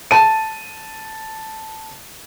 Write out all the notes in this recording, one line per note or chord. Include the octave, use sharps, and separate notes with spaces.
A5 D#7